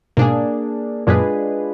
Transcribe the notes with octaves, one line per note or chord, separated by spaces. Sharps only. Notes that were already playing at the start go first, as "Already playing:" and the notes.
G#2 B2 A#3 D4 G#4
F#2 A#2 G#3 D4 F4 G#4 B4